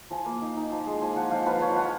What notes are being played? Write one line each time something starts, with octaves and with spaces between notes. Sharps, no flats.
F3 G#5
A#3
D#4
D#4
F3
G#3
F3 G#5
F3 F#5
F3 F5
F3 B4
F3 C#5
F3 F#5